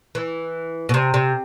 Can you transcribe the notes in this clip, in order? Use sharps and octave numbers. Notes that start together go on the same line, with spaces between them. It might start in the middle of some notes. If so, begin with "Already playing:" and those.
E3
B2
C3
C3